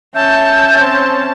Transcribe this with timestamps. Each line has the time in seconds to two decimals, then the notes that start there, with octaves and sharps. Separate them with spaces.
0.15 C#4 E5 A5 G6
0.79 C4